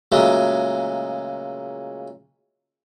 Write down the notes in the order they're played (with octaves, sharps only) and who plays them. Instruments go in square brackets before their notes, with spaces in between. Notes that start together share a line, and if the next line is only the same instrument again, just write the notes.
[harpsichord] A#2 C#3 F#3 G#3 A3